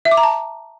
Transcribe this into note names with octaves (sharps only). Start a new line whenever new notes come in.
E5
D6
A#5
A5